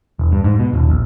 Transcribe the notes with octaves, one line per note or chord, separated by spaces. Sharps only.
E1
G2
G#2
B2
D#1
A#1